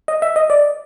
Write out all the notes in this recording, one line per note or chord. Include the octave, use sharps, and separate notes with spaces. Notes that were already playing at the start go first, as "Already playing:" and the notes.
D#5
E5
D#5
D5